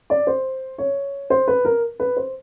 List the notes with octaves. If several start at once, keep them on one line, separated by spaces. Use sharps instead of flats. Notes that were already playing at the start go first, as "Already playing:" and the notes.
D5
C5
C#5
C5
B4
A#4
B4
C5